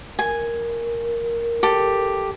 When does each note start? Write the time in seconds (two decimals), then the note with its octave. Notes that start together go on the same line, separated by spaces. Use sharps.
0.19 A#4 G#5
1.63 G4 A4